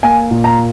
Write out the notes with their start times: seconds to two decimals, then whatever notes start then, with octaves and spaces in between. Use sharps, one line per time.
0.03 A#3 G#5
0.31 A#2
0.44 A#5